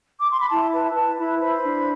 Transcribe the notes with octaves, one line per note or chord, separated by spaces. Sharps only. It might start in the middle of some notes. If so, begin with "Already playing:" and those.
D6
C6
B5
E4 A5
B4 A5
B4 A5
E4 B5
C5 B5
D4